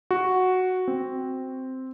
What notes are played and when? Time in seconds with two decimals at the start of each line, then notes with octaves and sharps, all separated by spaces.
0.11 F#4
0.88 C4